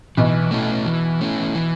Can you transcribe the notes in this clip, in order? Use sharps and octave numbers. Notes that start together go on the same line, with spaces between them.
B1 B2 E3
A3 C#4 E4
E3
A3 C#4 E4
E3